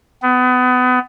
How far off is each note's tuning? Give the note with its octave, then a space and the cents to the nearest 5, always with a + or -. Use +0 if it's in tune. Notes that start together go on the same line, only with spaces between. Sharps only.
B3 +30